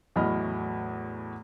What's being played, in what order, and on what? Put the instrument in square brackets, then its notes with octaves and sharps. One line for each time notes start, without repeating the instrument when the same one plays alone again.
[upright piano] E2 A2 F#3 D#5 B5 F6